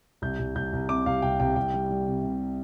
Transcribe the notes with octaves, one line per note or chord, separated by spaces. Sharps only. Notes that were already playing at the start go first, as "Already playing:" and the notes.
C2 G6
C2
C2 G6
C2
C3 D6
C2 F5
C2 G5
C2 G5
C2 G5
G3
G3
C3
C3